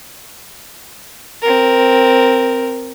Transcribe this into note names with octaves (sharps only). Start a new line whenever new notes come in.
C4 A#4